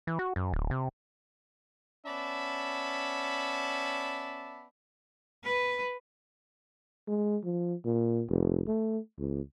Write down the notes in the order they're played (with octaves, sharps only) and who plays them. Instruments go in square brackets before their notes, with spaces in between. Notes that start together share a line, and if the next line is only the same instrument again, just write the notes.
[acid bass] E3
F#4
F#2
D1
C3
[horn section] B3 C#4 D5 E5 A5 B5
[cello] B4
[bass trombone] G#3
F3
A#2
F1
A3
C#2